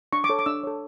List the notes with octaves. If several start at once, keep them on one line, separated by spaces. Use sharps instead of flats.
D4 C#6
D6
A4 C#5
D6
D4 E6
A4 C#5